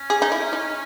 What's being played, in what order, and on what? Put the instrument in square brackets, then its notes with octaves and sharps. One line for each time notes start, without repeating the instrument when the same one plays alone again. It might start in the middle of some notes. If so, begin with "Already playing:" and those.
Already playing: [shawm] C#4
[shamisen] G#4
D#4
E4
D#4